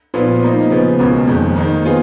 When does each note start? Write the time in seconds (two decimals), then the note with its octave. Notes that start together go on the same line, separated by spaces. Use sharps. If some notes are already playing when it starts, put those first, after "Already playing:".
0.14 A#2 F3 B3 F4
0.42 F3 A#3 D#4
0.70 C#3 F3 B3
0.99 C#2 B2 A#3 C#4
1.27 F2 D#3 G#3
1.56 D#3 A#3 D#4
1.85 F3 B3 F4 G#4